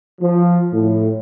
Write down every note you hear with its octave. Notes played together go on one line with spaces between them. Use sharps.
F3
A2